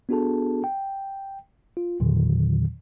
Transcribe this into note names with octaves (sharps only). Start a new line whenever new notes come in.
B3 D4 F#4 G#4 A4 A5
G5
F4
E2 A#2 D3 D#3 F#3